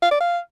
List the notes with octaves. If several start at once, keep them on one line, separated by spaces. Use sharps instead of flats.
F5
D5
F5